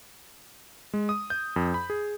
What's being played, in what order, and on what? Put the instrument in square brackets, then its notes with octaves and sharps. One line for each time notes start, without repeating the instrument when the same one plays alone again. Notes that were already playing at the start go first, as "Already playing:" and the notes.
[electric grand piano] G#3
D#6
G6
F2
B5
G#4